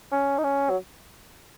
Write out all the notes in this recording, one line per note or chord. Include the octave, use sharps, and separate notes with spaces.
C#4
D#4
C#4
F#3